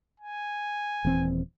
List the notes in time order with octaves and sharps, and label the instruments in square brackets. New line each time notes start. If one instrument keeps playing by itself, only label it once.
[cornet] G#5
[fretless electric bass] D#1 E3 C4